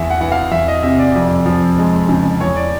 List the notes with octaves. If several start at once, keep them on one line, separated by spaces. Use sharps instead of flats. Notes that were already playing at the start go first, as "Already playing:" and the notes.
Already playing: E2 E5
F#5
E3 F#5
F5
E2 E5
D#5
C3 E5
D5
F2
F3
G#3
C#3
E2 C#5
D5